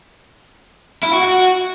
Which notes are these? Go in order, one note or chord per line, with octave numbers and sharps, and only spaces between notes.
E4
F#4
F#4